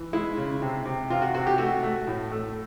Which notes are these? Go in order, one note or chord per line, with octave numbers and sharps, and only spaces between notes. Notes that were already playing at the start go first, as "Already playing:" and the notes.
Already playing: E3
G#3 E4
C#3
C3
C3
C3 F4
F#4
C3 F#4
G4
A3 F#4
A3
A2
A3